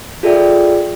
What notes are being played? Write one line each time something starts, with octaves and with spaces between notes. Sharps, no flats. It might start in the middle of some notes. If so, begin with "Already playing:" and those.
F4 G#4 A4 D5 E5 G5